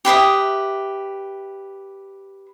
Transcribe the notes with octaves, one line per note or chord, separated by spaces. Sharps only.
G4 B4 E5 D#6